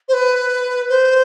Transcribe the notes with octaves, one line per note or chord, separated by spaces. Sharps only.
C5
B4
C5